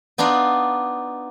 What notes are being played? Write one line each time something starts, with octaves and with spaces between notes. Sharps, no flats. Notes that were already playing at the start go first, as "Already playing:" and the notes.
B3 D4 D#4 F4 D5